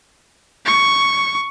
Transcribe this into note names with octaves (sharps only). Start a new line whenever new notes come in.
C#6